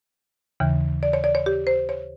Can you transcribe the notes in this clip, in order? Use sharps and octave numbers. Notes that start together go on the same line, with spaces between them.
D#2 C#3 E3
D5
C#5
D5
C#5
G4
C5
C#5